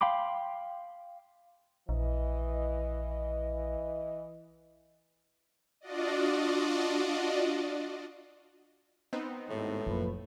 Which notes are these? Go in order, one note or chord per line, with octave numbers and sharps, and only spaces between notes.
F5 G5 B5 C6 D6
A#1 E3 D#5
D4 F4 F#4 D5 D#5
B3 C4 D#4
G#1 D#2 A2
F#1 A#2 F3 B4